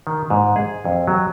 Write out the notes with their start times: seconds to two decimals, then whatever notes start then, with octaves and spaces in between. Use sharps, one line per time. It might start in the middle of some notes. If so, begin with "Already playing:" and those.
0.07 D#3
0.30 G#2
0.56 G#4
0.85 F2
1.07 F#3